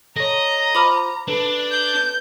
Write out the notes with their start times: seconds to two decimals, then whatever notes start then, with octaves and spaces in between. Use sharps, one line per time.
0.16 A4 C#5 D#5 A#5
0.75 F4 C5 B5 D6 F6
1.28 D4 A4 B4
1.71 G6